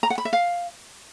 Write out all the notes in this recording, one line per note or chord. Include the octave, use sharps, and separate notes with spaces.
A#5
F#5
B5
E5
F5